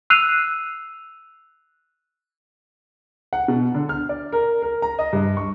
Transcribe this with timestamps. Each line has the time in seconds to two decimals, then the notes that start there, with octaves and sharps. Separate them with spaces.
0.10 E6 F#6 C7 D#7 F7
3.33 F#5
3.48 B2
3.75 D3
3.89 F6
4.09 D5
4.32 A#4
4.62 A#4
4.82 A#5
4.99 D#5
5.13 G2
5.37 C#6